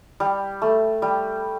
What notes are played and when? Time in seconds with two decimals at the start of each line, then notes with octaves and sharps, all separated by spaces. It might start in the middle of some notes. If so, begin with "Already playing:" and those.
0.20 G3
0.62 A3
1.02 G3